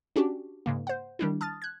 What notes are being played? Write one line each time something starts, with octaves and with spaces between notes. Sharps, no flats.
C#4 D4 F#4 G4
G#2 C#3 A#3
C5 F#5
D#3 G3 D4 E4
A5 D#6 F6 A6
F#6 G#6